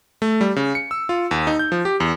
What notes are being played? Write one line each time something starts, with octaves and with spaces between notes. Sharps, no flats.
A3
G3
C#3
C#7
E6
F4
D#2
D#4
G6
F3
G4
E2